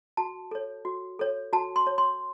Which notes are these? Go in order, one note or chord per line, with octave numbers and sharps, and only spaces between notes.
F#4 A5
A4 C#5
F#4
A4 C#5
F#4 A5
C6
C#5
C6